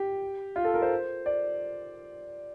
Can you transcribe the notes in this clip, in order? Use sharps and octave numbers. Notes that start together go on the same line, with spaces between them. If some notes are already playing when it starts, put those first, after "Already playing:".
Already playing: G4
F4
A4
A#4
C5
D5